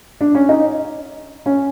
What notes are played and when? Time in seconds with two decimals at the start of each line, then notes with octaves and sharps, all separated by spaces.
0.21 D4
0.35 C#4
0.49 D#4
1.46 C#4